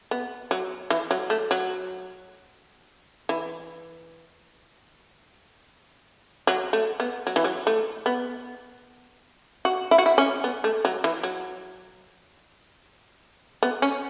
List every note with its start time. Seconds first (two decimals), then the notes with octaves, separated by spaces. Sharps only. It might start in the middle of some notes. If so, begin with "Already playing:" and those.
0.11 B3
0.51 F#3
0.90 E3
1.11 F#3
1.30 A3
1.51 F#3
3.29 E3
6.47 F#3
6.73 A3
7.00 B3
7.27 F#3
7.36 E3
7.44 F#3
7.67 A3
8.06 B3
9.65 F#4
9.91 E4
9.98 F#4
10.06 E4
10.18 C#4
10.44 B3
10.64 A3
10.85 F#3
11.04 E3
11.23 F#3
13.63 B3
13.82 C#4